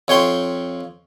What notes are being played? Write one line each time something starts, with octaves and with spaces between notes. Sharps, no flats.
F2 C#5 G5 C6